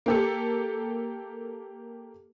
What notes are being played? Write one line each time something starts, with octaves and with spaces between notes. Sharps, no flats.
A#3 G4 A4